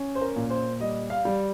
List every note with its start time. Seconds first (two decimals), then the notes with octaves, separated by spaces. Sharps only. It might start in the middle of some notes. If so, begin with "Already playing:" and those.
Already playing: C#4
0.15 C5
0.21 A#4
0.36 A#2
0.50 C5
0.80 G3 D#5
1.10 F5
1.25 G3